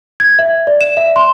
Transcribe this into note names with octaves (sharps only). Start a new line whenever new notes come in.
G#6
E5
D5
E7
E5
C6